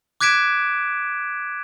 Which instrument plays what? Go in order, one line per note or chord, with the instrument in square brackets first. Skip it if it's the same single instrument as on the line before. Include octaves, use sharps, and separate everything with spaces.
[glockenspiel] D6 F#6 G#6 B6 D7 E7